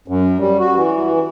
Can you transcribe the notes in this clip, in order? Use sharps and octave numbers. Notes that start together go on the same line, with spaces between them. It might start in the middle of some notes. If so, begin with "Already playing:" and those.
F#2
G3
F#4
E3